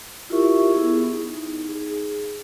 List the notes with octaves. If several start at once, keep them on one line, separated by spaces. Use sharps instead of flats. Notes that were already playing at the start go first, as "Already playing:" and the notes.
E4 F4 G4 A#4 E5 C#6
B3 E4 G#4
D#4
G#4